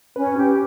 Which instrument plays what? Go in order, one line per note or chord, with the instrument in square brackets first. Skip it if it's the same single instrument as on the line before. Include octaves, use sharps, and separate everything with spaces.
[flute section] C#4 [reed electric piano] B4
[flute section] G4